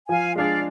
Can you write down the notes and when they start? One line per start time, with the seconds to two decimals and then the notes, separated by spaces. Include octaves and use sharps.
0.08 F3 F5 G#5
0.35 G#3 D4 G#4 D5 F5